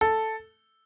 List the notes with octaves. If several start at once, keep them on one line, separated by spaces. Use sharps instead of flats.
A4